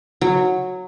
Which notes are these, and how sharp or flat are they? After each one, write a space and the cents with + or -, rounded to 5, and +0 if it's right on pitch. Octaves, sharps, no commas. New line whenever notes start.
F#3 -10